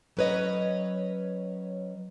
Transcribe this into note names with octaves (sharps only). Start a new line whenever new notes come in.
F#3 C#4 B4 C#5 D#5